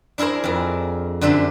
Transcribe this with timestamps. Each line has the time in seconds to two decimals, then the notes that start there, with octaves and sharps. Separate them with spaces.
0.18 D4 E4 G#4 A#4 C5
0.44 F2 A#4
1.21 F#2 D3 D4 C5 E5